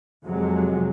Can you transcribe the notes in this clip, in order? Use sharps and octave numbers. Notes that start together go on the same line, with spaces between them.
F2 C3 F#3 G#3